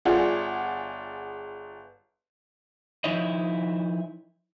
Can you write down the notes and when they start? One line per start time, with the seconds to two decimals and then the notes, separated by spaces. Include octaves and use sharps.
0.05 G1 F4 G#4 D5 F#5
3.04 F3 G#3 D#4 E4 C#5 D#5